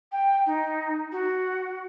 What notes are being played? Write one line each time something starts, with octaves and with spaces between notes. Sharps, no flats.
G5
D#4
F#4